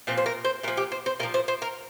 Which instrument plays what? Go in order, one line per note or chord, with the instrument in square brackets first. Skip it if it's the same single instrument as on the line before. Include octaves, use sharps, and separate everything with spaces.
[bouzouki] A#2 F3 C4
C5
A#4
C5
A#2 A#4
F3
G4
C5
C5
A#2 A#4
F3
C5
C5
A#4